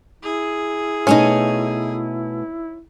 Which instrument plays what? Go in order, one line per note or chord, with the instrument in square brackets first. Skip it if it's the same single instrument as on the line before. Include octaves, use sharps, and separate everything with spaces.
[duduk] E4 [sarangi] G#4
[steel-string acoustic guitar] B2 A3 G#5 [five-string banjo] C#4 D#4